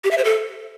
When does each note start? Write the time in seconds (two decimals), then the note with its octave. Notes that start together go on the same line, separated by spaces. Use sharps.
0.04 G4
0.11 E5
0.18 C5
0.25 A4